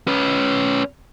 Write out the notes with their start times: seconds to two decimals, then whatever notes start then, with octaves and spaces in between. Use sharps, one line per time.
0.08 C#4 B4